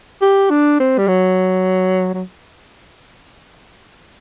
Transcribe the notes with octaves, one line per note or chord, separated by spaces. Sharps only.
G4
D4
C4
G3
F#3
F#3